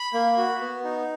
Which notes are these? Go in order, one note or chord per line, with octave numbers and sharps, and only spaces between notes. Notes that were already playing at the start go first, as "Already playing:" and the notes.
Already playing: B5
A#3
F#4
B3
D#4